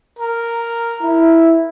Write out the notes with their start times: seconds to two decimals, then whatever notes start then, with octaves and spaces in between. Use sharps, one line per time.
0.19 A#4
1.02 E4